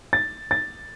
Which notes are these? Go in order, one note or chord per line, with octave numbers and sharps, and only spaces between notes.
A6
A6